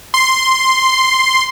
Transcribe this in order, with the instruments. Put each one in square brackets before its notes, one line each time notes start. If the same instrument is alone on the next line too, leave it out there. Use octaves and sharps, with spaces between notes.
[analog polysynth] C6